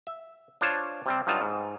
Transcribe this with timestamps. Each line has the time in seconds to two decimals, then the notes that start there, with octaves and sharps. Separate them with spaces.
0.07 E5
0.61 D4 F4 C5 C#5 A5
1.06 C3 G3 C4
1.27 G2 F#3 D#4 F4 A5
1.42 G#2